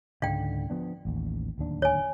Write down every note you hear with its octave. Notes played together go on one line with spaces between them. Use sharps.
C#2 G#2 D3 F5 G5
F3 B3 D4
A1 D#2
D1 D#2 D4
C#5 G#5